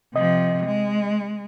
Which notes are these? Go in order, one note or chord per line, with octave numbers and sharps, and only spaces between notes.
C3 F3 D#5
G#3